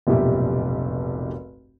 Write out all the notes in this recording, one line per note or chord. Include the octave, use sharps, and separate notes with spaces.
F1 B1 G2 A#2 G4 E5